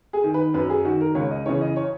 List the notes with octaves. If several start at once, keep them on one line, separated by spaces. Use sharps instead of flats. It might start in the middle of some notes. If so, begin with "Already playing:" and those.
G#4
D#3
B4
F#2 B4
G#4
D#3 F#4
A#4
C#2 C#5
D#5
C#3 E3 C#5
D#5
C#5